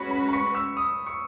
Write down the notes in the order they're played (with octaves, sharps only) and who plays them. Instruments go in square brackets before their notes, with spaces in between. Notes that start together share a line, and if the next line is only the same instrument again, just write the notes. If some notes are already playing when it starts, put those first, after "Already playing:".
Already playing: [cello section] G#3 C#4 F#4 B4 [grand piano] B5
[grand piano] B5
B5
C#6
E6
D#6
C#6